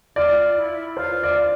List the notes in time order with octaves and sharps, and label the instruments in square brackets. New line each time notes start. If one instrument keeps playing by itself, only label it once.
[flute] F4 [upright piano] D5
[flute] E4
[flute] F4 [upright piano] C5
[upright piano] D5